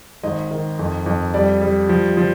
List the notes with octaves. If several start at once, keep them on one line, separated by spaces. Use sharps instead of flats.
G#1 D#5
D#3
F2
F2
G3 D5
G3
F3
F3